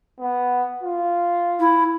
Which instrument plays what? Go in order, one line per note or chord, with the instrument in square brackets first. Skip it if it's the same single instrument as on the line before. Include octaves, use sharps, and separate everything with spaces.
[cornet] B3
F4
[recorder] E4